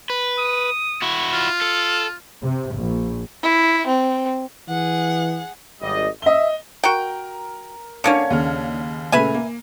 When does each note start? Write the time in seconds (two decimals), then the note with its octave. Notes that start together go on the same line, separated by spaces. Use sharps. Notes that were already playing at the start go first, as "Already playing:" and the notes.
0.10 B4
0.38 D#6
1.02 E4 F#4
1.33 F4
1.61 A4
2.43 C3
2.75 A#1
3.43 E4
3.87 C4
4.69 E3 G#4 F#5
5.82 G#1 G3 D#5
6.22 D#5 E5 G7
6.83 F#4 A#4 G5
8.04 D3 A#3 C#4 D4 G#6 C#7
8.30 D#2 C#3 F6
9.12 A#2 C#3 A3 B4 E5 G#5
9.34 A#3